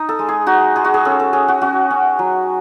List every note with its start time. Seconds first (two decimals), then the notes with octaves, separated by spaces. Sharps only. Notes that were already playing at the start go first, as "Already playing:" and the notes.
Already playing: D#4
0.09 A4
0.19 G#3
0.29 G#4
0.47 D#4 F#4
0.76 G#3 G#4
0.84 F#4
0.94 G#4
1.05 C#4 A4
1.20 A4
1.33 C#4 G#4
1.48 F#4
1.62 C#4 F#4
1.91 C#4
2.19 F#3